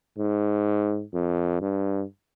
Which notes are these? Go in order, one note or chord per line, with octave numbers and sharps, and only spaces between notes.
G#2
F2
G2